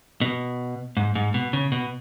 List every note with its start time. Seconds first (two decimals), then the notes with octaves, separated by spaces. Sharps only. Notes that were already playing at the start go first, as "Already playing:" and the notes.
0.21 B2
0.97 G#2
1.15 G#2
1.34 B2
1.53 C#3
1.72 B2